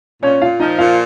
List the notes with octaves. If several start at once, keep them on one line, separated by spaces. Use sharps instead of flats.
A#2 C#4 C#5
A#2 F4 F5
F3 D#4 D#5
A#2 F4 F5